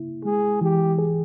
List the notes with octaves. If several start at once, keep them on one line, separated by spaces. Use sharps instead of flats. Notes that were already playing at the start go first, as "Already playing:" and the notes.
Already playing: C#3 A#3 E4
G#3 G#4
E3 G4
G#4